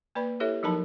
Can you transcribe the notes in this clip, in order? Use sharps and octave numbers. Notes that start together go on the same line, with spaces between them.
A#3 B4 D5 B5
E4 G4 A4 C#5 E5
F3 F#3 D#4 A#4 A5 B5